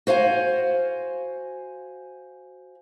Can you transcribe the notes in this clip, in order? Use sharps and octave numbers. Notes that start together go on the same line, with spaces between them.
F#4 C5 F5 G#5